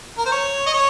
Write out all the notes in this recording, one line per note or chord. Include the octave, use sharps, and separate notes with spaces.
A#4
C5
C#5
D#5
C#5